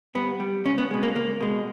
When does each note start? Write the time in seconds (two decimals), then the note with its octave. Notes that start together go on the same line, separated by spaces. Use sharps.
0.15 G2 B3
0.40 G3
0.65 C#2 C#4
0.78 B3
0.91 B2 G#3
1.03 A#3
1.15 C#2 A#3
1.40 B2 G#3